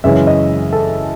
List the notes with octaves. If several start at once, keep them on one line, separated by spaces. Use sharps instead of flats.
F#2 C#3 E3 G#3 C#4 E5
D#5
A4